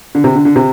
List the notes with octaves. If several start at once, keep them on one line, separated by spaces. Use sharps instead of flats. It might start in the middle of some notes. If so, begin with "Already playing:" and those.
D3
C3
D3
D3
C3